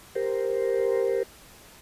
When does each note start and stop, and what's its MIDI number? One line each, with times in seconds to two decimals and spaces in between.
0.15 1.23 67
0.15 1.23 70
0.15 1.23 72